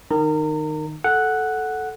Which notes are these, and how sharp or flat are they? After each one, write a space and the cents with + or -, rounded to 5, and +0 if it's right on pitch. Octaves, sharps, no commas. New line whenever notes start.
D#3 -15 A#5 -35
A4 -10 F#5 +0